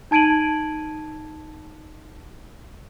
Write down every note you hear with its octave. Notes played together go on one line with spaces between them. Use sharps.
D#4 A5 G#6 D7 D#7 F#7